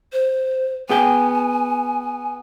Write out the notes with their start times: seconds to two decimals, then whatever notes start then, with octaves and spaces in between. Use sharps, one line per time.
0.13 C5
0.89 B3 G#4 G5 G#5